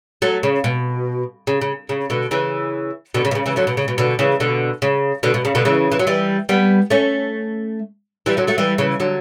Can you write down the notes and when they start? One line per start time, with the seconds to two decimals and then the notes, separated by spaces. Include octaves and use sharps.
0.22 F#3 A3
0.43 C#3
0.64 B2
1.47 C#3
1.61 C#3
1.89 C#3
2.10 B2 D3
2.31 C#3 E3
3.14 B2 D3
3.25 C#3
3.31 B2
3.35 C#3
3.46 C#3 E3
3.56 D3 F#3
3.67 B2
3.77 C#3
3.88 B2
3.98 B2 D3
4.19 C#3 E3
4.40 B2 D3
4.82 C#3
5.23 B2 D3
5.34 B2
5.45 C#3
5.55 B2 D3
5.65 C#3 E3
5.92 E3
5.99 F#3
6.07 E3 G3
6.49 G3 B3
6.90 A3 C#4
8.26 E3 G3
8.37 D3 F#3
8.47 F#3 A3
8.58 E3 G3
8.78 C#3 E3
9.00 D3 F#3